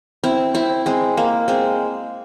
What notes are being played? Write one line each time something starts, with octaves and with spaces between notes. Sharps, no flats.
C4 E4
C4 E4
G#3 C4
A#3
G#3 C4